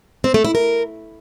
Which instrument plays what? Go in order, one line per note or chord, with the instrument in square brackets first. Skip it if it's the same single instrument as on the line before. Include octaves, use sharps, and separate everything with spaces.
[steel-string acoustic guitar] C4
A3
E4
A#4